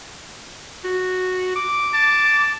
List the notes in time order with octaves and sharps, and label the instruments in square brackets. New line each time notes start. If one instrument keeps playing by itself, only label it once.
[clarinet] F#4
D6
[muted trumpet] A5